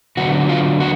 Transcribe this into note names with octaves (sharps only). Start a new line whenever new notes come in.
D3 F#3 B3 F#4
F4
F#4